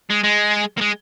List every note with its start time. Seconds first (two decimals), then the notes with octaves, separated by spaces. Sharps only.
0.10 G#3
0.23 G#3
0.77 A#3
0.81 G#3